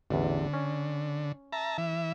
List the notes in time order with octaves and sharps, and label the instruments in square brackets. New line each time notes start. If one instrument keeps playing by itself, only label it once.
[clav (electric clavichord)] A1 E2 [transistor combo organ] D3
[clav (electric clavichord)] C#4
[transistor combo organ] E5 A5 A#5
E3 E5